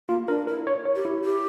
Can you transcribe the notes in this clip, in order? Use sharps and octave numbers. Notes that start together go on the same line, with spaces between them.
A#3 F4
D4 A#4
E4 A#4
C#5
C#5
G4
E4
G4